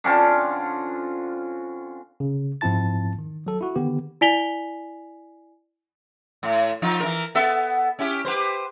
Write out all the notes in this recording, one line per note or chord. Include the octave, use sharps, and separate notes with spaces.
D3 C4 C#4 F4
C#3
G#2 F3 C4 E4 A5 A6
D#3
F#3 A4
E4 F#4
D3 D#3 B3 G4
E4 D5 G#5 B6 F7 G7
A2
F3 D#4 F4
E3 A#4
B3 A4 E5
C#4 E4 G4
G4 B4 C5